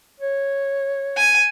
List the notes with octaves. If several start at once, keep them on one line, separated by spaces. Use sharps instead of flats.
C#5
G#5